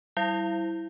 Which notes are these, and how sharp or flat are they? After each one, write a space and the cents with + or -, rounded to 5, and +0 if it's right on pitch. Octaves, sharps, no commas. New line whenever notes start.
G3 -30 E4 +0 F5 -35